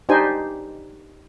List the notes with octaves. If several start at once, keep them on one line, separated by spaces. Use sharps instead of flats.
D4 D#4 G4 C5 G#5